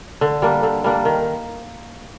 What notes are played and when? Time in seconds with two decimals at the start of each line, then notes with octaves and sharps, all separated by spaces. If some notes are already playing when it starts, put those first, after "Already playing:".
0.21 D3
0.42 G3 A#3 D4
0.63 D3
0.84 G3 A#3 D4
1.05 D#3